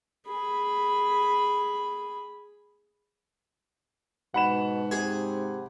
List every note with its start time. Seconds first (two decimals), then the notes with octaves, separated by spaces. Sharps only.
0.27 G#4 B5
4.34 G#2 B2 F#5 B5 E7
4.91 C3 G#4